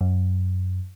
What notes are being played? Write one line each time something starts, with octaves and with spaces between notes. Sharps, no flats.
F#2